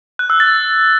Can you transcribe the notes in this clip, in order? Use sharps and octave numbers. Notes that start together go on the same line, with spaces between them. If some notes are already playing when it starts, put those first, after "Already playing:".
F#6
E6
A6